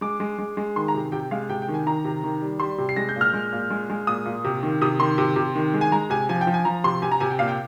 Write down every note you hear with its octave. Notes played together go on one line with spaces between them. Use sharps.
G#3 D6
G#3
G#3
G#3
D#3 C6
A#5
C3
C3 G5
G#3 F5
C3 G5
G5
D#3
G#5
D#3 A#5
C3
D#3
G3
G3 C6
C3
C7
G#3 A#6
G6
A#2
F6
G#3
A#2
G#3
G#3
A#2 D#6
A#2
C3
D#3
C3 D#6
D#3 C6
C3
C3
D#3
G#3
G#5
G#3 A#5
C3 G#5
F3 G#5
G5
F3
G#5
F3 A#5
C3 C6
C3 G#5
A#5
C3 G#5
G5
A#2 F5
G5